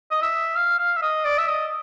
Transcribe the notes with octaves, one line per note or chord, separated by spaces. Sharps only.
D#5
E5
F5
F5
E5
D#5
D5
E5
D#5